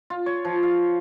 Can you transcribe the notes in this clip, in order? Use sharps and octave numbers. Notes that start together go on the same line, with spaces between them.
F4
C#5
F3
F5